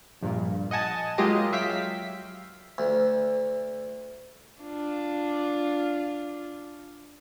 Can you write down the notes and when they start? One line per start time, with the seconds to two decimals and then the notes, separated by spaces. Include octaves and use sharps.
0.21 A#1 G2 A#2
0.71 D#5 F#5 G#5 A5
1.18 F#3 G#3 A#3 F4 G4 D#5
1.52 F#3 E5 F5 G5 B6
2.78 D2
4.61 D4 F4